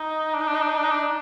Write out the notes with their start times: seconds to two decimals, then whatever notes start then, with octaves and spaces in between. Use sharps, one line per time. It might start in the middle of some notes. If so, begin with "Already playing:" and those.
Already playing: D#4
0.34 D4
0.41 D#4
0.48 D4
0.55 D#4
0.62 D4
0.69 D#4
0.77 D4
0.84 D#4
0.91 D4